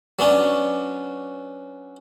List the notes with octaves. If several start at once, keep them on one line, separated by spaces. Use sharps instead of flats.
F#3 B3 C#4 D4